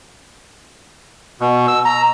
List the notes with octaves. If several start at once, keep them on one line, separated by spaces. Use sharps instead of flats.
B2
E6
A#5